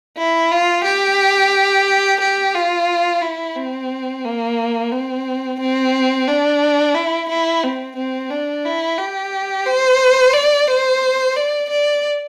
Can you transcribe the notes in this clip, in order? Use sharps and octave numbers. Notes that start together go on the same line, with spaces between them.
E4
F4
G4
G4
F4
E4
C4
A#3
C4
C4
D4
E4
E4
C4
C4
D4
E4
G4
C5
D5
C5
D5
D5